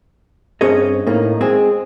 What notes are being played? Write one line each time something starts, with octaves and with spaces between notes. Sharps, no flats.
G2 C4 C#4 G#4 C#5 D#5
A2 A#3 D#4
G#3 C4 G#4